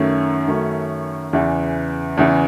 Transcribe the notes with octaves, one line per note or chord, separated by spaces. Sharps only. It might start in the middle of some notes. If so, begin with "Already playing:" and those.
Already playing: F#2 D#3 A3 C#4
F#2 D#3 A3 C#4
E2 C#3 E3
E2 C#3 E3